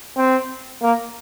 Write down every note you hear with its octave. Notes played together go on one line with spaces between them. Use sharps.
C4
A#3